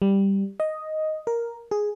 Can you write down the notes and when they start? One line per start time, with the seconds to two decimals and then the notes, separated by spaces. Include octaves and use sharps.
0.02 G3
0.60 D#5
1.27 A#4
1.71 G#4